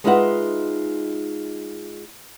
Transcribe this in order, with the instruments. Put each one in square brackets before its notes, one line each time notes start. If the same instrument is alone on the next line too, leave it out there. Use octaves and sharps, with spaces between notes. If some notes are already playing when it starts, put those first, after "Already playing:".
[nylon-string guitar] G#3 D#4 F4 B4 E5 F#5